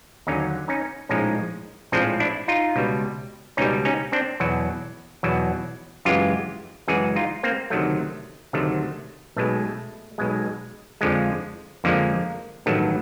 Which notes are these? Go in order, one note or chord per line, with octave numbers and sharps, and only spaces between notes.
D#2 D3 F#3 C#4 D#4
C#4 D#4
A#1 A2 F3 G#3 C#4 D#4
A#1 A2 F3 G#3 C4 D4
D4 E4
D#4 F4
C#2 B2 G3
C#2 B2 G3 C#4 D#4
C#4 D#4
C4 D4
E2 B2 F#3
E2 B2 F#3
F#2 C#3 E3 G#3 F4 G4
F#2 C#3 E3 G#3 F#4 G#4
D#4 F4
A#3 C4
D2 C3 D#3 F#3 A3
D2 C3 D#3 F#3 A3
B1 B2 G#3 A3
B1 B2 G#3
F2 D3 F3 G#3
F2 D3 F3 G#3 A#3
A1 G2 D#3 F#3 A3